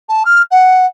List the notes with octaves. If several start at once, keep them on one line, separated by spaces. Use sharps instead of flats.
A5
F6
F#5